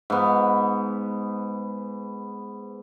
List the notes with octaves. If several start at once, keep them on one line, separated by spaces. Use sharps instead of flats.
G#2 B3